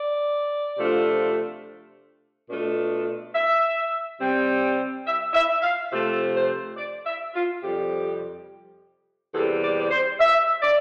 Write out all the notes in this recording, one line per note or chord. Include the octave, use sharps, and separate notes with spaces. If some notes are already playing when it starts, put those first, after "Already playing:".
Already playing: D5
C3 F3 A3 D4 F4
B2 A3 D4 F4
E5
C3 G3 C4
E5
E5
F5
C3 F3 A3 E5
C5
D5
E5
F4
F2 C3 G3 G4
E2 C3 G3 A4
D5
D5
C5
E5
D5